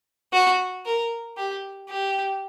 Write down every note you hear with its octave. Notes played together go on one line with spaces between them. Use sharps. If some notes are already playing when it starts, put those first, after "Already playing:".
F#4
A#4
G4
G4